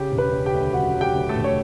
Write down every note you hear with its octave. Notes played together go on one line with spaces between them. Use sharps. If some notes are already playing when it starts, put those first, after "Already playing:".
Already playing: C#3 G4 G5
E1
B4 B5
C#3
G4 G5
D2
F#3 F#4 F#5
F#3
G4 G5
D2
A3 A4
E1
C#5